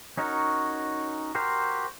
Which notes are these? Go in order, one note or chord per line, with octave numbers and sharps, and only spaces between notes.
C#4 D#4 F#4 A#4 C#5
F#4 G4 A#4 C5